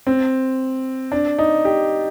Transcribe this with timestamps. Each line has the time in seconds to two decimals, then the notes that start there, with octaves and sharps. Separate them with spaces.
0.07 C4
1.12 D4
1.39 D#4
1.65 G4